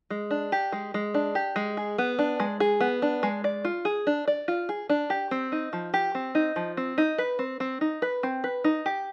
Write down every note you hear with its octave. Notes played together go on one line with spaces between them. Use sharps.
G#3
D4
G4
G#3
G#3
D4
G4
G#3
G#4
B3
D4
G#3
G#4
B3
D4
G#3
D5
F4
G#4
D4
D5
F4
G#4
D4
G4
C4
D#4
F3
G4
C4
D#4
F3
C4
D#4
B4
C4
C4
D#4
B4
C4
B4
D#4
G4